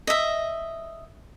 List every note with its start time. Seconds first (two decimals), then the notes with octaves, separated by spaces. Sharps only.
0.07 D#5 E5